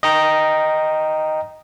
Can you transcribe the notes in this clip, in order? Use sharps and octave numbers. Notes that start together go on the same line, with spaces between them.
D#5 G5 A#5